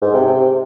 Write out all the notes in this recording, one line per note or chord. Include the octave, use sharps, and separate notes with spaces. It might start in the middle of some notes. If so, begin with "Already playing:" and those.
G#2
C3
C3